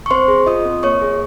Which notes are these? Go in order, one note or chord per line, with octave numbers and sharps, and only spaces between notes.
C#6
C4 C5 C6
G#4
F4 D#5 D#6
C4
A#3 C#5 C#6
G#4